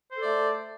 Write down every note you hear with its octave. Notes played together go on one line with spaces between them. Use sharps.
A3 A4 C5 D5